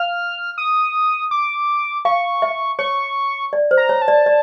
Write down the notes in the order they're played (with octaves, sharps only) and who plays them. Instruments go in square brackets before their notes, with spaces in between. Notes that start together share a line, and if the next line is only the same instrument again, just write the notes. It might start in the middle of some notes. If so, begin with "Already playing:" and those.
Already playing: [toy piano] F5 [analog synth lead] F6
[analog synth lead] D#6
D6
[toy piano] F5 [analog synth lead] C#6
[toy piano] E5
[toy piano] C#5 [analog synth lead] C#6
[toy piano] D5
C5
[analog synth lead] A#5
[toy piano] C#5
[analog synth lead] A5
[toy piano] D5
D5